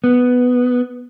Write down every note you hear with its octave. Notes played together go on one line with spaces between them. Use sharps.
B3